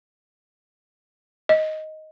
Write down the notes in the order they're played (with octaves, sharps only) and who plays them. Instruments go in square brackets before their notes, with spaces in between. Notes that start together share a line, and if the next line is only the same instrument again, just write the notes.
[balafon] D#5